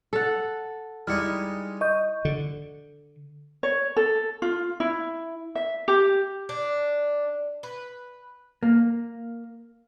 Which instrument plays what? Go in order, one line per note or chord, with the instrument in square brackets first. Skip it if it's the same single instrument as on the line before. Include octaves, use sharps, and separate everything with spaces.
[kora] A4 F#5
[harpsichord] G3 G#3 D#4 [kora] E4 [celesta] F6 C#7
[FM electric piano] D#5 [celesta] C#6 G6
[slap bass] D3
[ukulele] C#5
A4
F4
E4
E5
G4
[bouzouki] D4
B4
[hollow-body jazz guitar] A#3